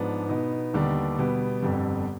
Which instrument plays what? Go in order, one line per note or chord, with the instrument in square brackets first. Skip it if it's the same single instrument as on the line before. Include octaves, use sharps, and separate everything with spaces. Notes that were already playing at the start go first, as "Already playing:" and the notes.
Already playing: [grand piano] G#2 F3 B3 D4
B2 B3 D#4
D#2 D3 G3 B3 D4
B2 G3 B3
G1 F2 D3 G3